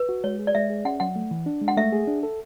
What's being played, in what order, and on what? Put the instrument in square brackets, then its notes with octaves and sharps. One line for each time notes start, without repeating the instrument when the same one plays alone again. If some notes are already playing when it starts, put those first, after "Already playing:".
Already playing: [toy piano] B4
[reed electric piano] F#4
[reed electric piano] G#3 [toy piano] C#5
[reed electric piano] G#4
[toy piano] D5
[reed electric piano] G#3 [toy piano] E5
[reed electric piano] G#4
[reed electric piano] C#4 [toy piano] F#5
[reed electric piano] F#3 [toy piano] F#5
[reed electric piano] A3
E3
D4
G#3
[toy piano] F#5
[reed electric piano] A3 [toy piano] E5
[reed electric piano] G#4
D4
A4